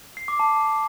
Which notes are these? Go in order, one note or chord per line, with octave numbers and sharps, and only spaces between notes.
C7
D6
A5